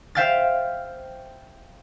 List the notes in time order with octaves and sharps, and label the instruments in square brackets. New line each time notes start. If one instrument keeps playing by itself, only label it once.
[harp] C5 E5 F5 G5 F6 A6